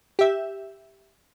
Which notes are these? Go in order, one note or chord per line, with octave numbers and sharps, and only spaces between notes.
G4 E5